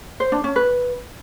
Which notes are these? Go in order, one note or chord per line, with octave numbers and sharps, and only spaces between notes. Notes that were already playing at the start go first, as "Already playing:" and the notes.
C5
D4
C#4
B4